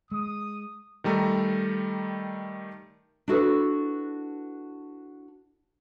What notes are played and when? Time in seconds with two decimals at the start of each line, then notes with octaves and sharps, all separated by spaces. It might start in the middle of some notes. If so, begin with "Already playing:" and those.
0.11 G#3 D#6
1.04 D#3 G3 A3 A#5
3.28 D4 E4 F#4 A4 B4